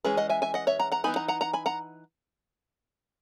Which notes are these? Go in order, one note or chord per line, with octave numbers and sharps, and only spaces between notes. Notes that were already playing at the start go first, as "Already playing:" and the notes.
E3 G#3 C#4 G#4 B4
D#5 F#5
E5 G#5
E5 G#5
D#5 F#5
C#5 E5
F#5 A#5
F#5 A#5
E3 B3 D#4 G#5 B5
F#5 A#5
F#5 A#5
F#5 A#5
G#5 B5
F#5 A#5